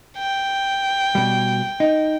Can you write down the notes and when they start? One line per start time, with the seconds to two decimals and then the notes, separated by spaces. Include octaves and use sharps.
0.18 G5
1.15 B2 G3
1.80 D#4